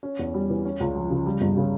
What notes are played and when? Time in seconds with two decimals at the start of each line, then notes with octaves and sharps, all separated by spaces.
0.03 C#4
0.19 E2
0.34 G3
0.50 E3
0.65 C#4
0.80 C#2
0.95 F3
1.10 C#3
1.26 G3
1.41 G1
1.57 C#3